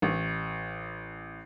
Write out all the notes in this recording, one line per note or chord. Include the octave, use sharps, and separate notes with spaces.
A1